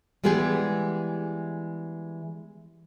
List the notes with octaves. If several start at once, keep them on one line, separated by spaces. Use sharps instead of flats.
E3 G3 G#3 B3 G4 G#4